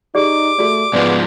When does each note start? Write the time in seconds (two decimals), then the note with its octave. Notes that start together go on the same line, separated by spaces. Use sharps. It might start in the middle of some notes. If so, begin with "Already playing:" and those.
0.15 D#4 G4 G#4 D5 D6
0.59 A3 F#4 G#4 D5
0.93 G#2 F3 G#3 B3 D5